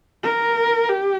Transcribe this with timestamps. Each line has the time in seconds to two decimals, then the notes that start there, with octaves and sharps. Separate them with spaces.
0.24 A#4
0.89 G4